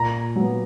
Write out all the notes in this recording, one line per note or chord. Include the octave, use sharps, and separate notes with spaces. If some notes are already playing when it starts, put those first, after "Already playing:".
Already playing: A#2 A#5
F#3 B3